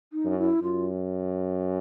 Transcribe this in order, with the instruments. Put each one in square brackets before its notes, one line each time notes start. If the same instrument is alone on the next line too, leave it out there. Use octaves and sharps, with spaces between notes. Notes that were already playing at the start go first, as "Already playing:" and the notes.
[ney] D#4
[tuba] F#2
[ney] E4
[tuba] F#2 [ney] F4